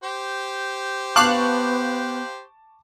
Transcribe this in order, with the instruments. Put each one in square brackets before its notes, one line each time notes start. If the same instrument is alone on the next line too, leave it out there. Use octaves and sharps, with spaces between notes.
[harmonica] G4 C5
[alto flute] B3 [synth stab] F5 F#6 [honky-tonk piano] A5 C#6 D6